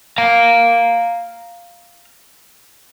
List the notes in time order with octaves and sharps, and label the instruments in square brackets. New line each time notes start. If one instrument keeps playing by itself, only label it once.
[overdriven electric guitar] F5 A#5